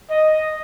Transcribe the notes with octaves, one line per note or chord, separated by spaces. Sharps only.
D#5